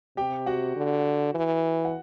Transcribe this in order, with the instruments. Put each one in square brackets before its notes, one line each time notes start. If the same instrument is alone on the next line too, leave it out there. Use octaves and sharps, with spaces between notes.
[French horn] C3 [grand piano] G4 G5
[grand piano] F#4 F#5
[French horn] D3
E3
[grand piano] F#5